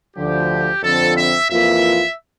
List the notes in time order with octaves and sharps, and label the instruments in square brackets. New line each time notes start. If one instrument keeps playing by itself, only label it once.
[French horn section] D2 D3 F3 [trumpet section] G4
[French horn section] F2 D3 F3 C4 [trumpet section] A4
[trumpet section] E5
[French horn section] F2 E3 A#3 F4 [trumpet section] E5